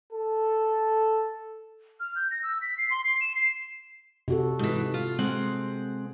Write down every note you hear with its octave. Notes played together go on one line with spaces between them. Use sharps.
A4
F6
G6
A#6
E6
B6
C7
C6
C7
E7
C7
C3 F#4 A4
G#2 E3
F4
G#3 C4 F#5